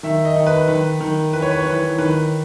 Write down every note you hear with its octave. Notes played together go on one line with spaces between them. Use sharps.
D#3 E5
D#5
D#3
B4
D#3 B4
D#3
E3 B4
C#5
B4
C#5
E3 B4
D#3 B4